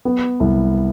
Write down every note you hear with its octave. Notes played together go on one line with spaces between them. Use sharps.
B3
C2